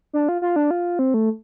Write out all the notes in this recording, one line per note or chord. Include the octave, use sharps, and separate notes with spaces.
D4
F4
F4
D4
F4
C4
A3